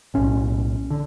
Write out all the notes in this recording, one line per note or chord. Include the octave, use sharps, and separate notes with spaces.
B1 A2 C#4
D3